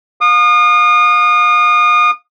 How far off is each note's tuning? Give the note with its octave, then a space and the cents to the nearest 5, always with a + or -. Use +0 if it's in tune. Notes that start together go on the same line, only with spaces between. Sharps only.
F5 +30 D#6 -30